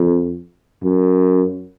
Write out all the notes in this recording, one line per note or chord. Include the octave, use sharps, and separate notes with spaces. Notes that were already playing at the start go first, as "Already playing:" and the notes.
Already playing: F2
F#2